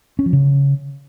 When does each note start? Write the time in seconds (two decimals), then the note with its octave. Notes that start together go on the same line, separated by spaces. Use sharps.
0.19 C#4
0.26 F3
0.33 C#3